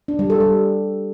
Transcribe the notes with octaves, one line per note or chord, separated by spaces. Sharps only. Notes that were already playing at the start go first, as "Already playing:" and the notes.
D4
G3
A4
G3